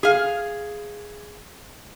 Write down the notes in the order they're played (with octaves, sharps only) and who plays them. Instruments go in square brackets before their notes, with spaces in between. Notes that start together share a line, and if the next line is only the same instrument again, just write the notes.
[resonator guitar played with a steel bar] G#4 F5